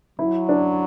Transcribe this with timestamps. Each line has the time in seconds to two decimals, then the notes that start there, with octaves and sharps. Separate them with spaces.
0.19 F#3 E4
0.49 D4